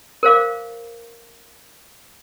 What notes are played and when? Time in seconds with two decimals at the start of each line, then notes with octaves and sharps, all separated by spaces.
0.23 A#4 C5 F5 D6